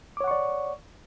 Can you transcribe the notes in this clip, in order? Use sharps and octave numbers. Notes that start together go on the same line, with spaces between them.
C#5 D5 F#5 C#6 D6